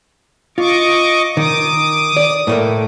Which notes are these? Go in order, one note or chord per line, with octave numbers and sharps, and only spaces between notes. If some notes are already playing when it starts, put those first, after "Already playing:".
F4 D#5 C#6 D6
D#3 D6 D#6
D5
A2 A3 A#3